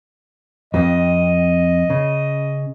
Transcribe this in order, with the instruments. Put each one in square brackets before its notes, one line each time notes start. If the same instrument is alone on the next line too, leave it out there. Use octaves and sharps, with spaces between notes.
[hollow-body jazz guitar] F2 C4 [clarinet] D#5
[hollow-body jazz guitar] C#3